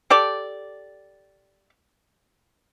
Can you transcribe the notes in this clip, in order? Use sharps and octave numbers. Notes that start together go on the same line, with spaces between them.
G4 A4 D5